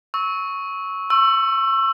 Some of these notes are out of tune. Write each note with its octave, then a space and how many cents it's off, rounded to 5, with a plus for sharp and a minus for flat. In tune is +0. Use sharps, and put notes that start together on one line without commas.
C#6 +0 E6 -25
C#6 -30 E6 +20